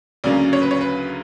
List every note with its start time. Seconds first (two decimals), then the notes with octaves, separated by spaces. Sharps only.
0.24 D2 C#3 F#3 A#3 C#4 D5
0.53 C#5
0.62 B4
0.71 C#5
0.81 B4